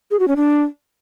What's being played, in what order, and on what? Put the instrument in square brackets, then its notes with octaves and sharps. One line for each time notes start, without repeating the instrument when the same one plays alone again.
[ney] G#4
F#4
C#4
D4